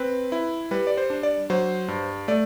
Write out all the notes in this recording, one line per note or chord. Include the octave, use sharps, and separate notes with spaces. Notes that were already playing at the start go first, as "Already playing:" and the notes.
Already playing: C4 B4
E4
G3 B4
D5
C5
D4
D5
F#3 C5
G2
A3 D5